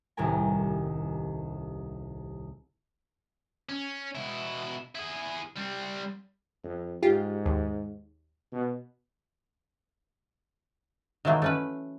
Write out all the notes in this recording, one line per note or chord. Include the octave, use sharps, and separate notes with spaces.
D#1 C2 A2 G4 A#4 G#5
C#4
B2 E4
E4 G#4
G3 C4
F2
G#2 F4 G4
D#2
B2
D#3 E3 F#3 A3 A#3
A3 C#4 B4